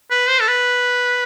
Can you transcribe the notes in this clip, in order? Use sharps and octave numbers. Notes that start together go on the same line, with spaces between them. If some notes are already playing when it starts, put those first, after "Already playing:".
B4
C5
A4
B4